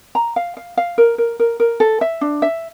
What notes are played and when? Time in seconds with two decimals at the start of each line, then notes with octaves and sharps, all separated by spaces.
0.15 A#5
0.36 F5
0.57 F5
0.77 F5
0.98 A#4
1.18 A#4
1.39 A#4
1.60 A#4
1.80 A4
2.01 E5
2.21 D4
2.42 E5